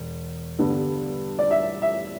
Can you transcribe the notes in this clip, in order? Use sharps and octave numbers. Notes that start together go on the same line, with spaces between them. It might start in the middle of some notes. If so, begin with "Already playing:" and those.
Already playing: E1
G2 D3 G3 B3
D5
E5
E5